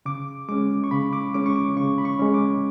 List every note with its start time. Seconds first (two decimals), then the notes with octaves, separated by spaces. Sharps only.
0.05 C#3 D6
0.49 G#3 C#4 D6
0.84 C#6
0.91 C#3 B5
1.13 D6
1.34 G#3 C#4 D6
1.46 C#6
1.56 D6
1.77 C#3 C#6
1.98 B5
2.05 C#6
2.19 G#3 C#4
2.34 D6